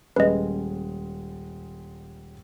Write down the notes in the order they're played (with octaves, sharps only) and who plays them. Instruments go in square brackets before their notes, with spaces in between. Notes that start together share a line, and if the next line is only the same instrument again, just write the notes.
[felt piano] D#1 G#3 C#4 [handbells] B4 D#5